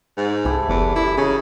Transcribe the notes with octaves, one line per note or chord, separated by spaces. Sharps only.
G#2
C2 E4 G4 A4
F#1 E2
F#2 G3 E4 D5
C#3 D#4 G#5